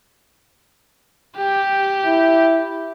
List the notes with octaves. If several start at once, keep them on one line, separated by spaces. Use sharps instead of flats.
G4
E4